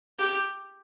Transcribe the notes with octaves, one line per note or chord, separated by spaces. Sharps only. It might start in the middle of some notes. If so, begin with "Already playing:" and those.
G4